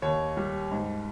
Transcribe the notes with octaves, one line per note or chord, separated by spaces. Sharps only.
D#2 C#5
G3
G#2